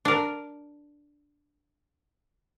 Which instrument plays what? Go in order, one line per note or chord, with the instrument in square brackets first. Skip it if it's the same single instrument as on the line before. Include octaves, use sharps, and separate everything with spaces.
[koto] D4 A#4